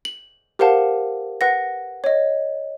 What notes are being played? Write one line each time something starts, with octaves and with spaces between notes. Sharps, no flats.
F#7
G4 A#4 C5 F5 F#5 A5
B4 F#5 A#6
C#5 D#5